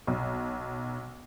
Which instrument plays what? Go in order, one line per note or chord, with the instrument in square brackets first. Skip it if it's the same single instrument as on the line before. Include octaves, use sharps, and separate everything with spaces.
[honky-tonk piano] B1